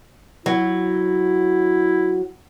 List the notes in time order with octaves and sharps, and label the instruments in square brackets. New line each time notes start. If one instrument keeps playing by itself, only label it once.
[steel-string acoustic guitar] F#3 [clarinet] E4